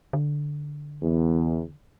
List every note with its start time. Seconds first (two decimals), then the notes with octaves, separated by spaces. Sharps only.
0.13 D3
1.03 E2